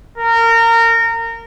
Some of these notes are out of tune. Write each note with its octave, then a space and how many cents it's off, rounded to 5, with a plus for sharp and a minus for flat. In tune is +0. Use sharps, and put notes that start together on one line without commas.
A#4 -25